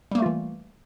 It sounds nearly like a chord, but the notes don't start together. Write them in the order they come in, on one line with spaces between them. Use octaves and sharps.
G3 A#3 A3 F4 E3